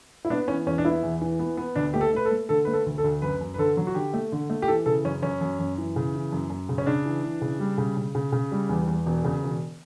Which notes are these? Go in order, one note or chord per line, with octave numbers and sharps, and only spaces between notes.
E4
B3 D4
E3 C#4
E2 C#4
D4
B3 E4
E2
E3
B3
B3
D2 D4
A3 G4
A4
A3 B4
A4
A3
D3 A4
A3 B4
A4
D2
A4
D2
F#2 B4
F#2
B4
D3 A4
F#3
F#4
D3 G4
A3
D3
A3
G4
E3 A4
C#3 A4
F#2 C#4
F#2 C#4
F#2
F#2
E3
C#3
E3
F#2
F#2
C#3
C#4
C#3 D4
E3
E3
C#3
G3
C#3
C#3
C#3
C#3
G3
E2
E2
E1
C#3
E1